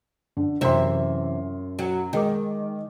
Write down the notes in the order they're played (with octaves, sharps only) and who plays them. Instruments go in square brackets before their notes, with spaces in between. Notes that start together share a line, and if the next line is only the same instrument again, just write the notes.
[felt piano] D3
[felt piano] F#2 C6 [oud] C3 E3 E5
[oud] F#3
[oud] D#3 [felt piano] G#3 A#4 D6